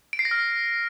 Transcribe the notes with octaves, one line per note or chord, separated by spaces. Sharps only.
D7
C7
A#6
F6